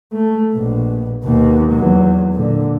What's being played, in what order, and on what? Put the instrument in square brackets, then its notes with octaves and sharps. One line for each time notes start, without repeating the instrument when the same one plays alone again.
[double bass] A3
A#1 B2
D#2 B2
E2 F#3
A#2 D3